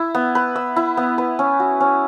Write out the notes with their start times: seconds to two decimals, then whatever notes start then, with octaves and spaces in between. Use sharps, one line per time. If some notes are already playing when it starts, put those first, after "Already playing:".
Already playing: E4 E5
0.15 B3
0.35 B4
0.56 E5
0.76 E4
0.97 B3
1.18 B4
1.39 C#4
1.60 F#4
1.80 C#4